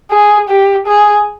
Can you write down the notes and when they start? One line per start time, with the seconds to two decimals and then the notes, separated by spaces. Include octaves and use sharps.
0.11 G#4
0.49 G4
0.87 G#4